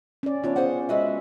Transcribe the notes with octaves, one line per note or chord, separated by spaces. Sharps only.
C#4 D5
E3 B3 C#4 D4 F4 C#5
C#4 G#4 C5 F#5
G#3 F#4 B4 E5